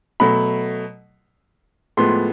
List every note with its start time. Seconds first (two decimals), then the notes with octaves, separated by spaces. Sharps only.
0.20 B2 F#3 A3 B5
1.97 A2 F3 G#3 B3 C6